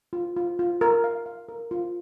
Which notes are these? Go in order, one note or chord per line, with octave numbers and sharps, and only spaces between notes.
F4
F4
F4
A#4
F5
F5
A#4
F4